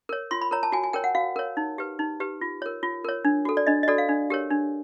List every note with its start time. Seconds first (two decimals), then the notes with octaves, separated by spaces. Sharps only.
0.09 A#4 C#5
0.31 F4 C6
0.41 B5
0.51 A#4 C#5 A#5
0.63 A5
0.72 F#4 G#5
0.84 G#5
0.93 A#4 C#5 G5
1.04 F#5
1.15 F#4 F5
1.36 A#4 C#5
1.57 D#4
1.78 G4 B4
1.99 D#4
2.20 G4 B4
2.41 F4
2.62 A#4 C#5
2.83 F4
3.04 A#4 C#5
3.25 D4
3.45 F#4 A4
3.57 D5
3.67 D4 D#5
3.83 D#5
3.88 F#4 A4 D5
3.98 F5
4.09 D4
4.30 G4 A#4 C#5
4.51 D4